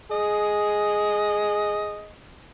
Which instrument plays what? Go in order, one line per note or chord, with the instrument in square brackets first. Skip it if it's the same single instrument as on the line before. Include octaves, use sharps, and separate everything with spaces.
[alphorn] G#4 [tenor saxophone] D#5